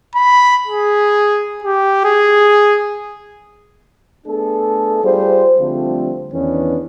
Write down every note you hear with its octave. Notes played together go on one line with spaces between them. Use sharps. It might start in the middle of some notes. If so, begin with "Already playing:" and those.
B5
G#4
G4
G#4
A3 B3 D4 G#4 A4
G3 F4 G#4 C5
D3 F3 G3 A3 C4 F4
E2 D#3 E3 B3 C#4 D4